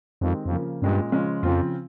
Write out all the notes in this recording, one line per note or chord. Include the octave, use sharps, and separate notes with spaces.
F2 D#3 G#3 C4 G4 A#4
F2
C#3 F3 A#3
G2 A#2 G#3 C#4
C#3 F3 G#3 C#4 F4
F2 C#3 F3 C4 F4